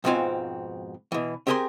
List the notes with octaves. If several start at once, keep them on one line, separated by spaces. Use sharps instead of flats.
F2 G#2 B2 C4 F4 G#5
B2 E3
C4 G4 G#4 A#4 G#5 C6